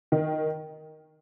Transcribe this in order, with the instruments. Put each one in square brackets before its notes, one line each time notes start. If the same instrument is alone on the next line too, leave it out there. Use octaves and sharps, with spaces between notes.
[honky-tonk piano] D#3